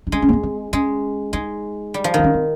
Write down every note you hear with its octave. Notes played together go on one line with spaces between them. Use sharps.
D#4
G#3 C#4
C#4
A#3
C4
C4
G#3 C#4
G#3 D#4
G3
F3
D#3 C4
C#4
C4